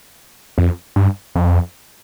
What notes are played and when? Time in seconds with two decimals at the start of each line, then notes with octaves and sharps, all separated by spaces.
0.58 F2
0.96 G2
1.35 F2